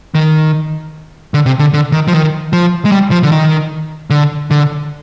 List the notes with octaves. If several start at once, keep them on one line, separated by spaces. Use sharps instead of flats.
D#3
D3
C3
D3
D3
D#3
F3
D#3
F3
G#3
G3
F3
D3
D#3
D3
D3